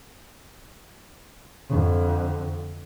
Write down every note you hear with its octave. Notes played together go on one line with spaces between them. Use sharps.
F2 D3